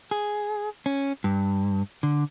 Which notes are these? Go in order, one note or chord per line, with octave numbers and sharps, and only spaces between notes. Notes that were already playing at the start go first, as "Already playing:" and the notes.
G#4
C#4
G2
D3